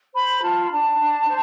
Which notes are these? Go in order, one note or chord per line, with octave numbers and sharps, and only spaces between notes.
C5 B5
F4 A5
B5
D4 A5
D4
C5